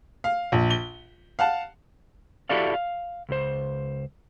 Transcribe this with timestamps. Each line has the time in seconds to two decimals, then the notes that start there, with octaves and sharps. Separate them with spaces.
0.24 F5
0.52 A#1
0.70 G7
1.39 F5 F#5 A5
2.49 E4 F#4 G4 A4 D5 F5
2.74 F5
3.29 C#2 C5